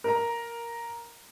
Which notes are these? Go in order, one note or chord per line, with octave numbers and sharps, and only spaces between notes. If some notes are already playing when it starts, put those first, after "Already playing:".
A#4 A#5